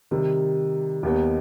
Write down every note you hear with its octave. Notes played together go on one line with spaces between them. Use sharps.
C3 D#3 G3
D#2 D#3 G3 B3 D#4